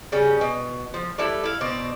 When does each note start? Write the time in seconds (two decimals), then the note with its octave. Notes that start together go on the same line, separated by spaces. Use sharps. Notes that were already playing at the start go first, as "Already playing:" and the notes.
0.12 C#3 G3 C#4
0.41 B2
0.94 F3
1.18 G3 E4 A4 B4
1.44 E4 F5
1.61 B2 C4 D4